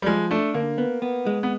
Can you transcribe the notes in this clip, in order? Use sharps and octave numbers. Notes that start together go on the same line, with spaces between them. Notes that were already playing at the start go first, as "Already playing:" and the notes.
G3
F3 G#3
A3 D4
D3 A#3
B3
B3
G#3
B3